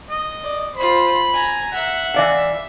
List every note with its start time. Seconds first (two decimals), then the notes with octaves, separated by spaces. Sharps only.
0.11 D#5
0.43 D5
0.76 F4 C5 B5
1.33 G#5 A#5
1.73 E5 F#5
2.14 E3 D5 F5